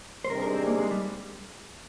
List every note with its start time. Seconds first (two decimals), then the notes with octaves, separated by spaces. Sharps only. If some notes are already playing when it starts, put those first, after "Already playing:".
0.25 C5
0.30 C3 D#3 G3 D4 G#4 A#4
0.42 A#4
0.54 C4
0.67 A#3
0.79 G#3
0.91 G3